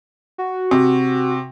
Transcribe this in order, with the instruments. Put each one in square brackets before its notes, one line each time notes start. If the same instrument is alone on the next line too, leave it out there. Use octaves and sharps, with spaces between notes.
[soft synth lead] F#4
[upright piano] C3